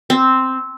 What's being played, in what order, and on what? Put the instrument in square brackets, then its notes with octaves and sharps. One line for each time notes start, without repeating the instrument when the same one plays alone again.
[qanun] C4